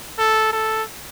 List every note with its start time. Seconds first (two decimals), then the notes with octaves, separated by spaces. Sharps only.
0.19 A4
0.53 A4